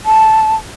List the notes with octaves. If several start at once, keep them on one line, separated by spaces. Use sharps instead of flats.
A5